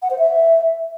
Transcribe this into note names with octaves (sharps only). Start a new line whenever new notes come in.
F#5
C5
E5